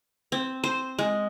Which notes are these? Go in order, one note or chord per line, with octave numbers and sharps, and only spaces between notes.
C4
C5
G#3